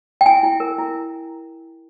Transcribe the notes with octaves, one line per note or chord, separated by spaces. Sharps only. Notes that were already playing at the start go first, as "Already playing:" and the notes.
G5
E4 G#5
E4
A#4
E4